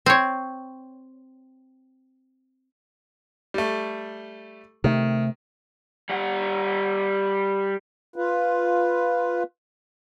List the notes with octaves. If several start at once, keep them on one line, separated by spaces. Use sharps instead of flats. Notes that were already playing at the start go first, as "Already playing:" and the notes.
C4 C#5
G3 A3
C3 D#3 A3
G3 F#5
F4 B4